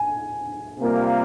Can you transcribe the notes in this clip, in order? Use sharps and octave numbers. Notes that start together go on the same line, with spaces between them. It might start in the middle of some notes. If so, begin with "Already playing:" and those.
Already playing: G#5
C3 G3 A#3 F4